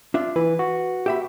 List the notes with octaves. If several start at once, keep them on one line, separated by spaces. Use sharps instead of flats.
D4 F4 E5
E3 B4
F#4
G4 E5 B5